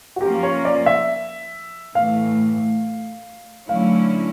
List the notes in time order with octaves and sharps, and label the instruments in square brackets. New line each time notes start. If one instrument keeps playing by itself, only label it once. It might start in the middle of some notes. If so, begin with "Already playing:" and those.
[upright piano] F#4
[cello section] F3 A#3 C#4 F4 A#4 [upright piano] G4
[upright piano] C#5
D5
E5
[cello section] A2 E3 A3 [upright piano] F5
[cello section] D3 F#3 A3 C#4 E4 [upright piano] F5